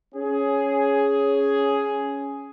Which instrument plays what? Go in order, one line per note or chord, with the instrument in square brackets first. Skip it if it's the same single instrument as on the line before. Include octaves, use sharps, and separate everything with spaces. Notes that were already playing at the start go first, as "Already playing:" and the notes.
[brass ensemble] C#4 G#4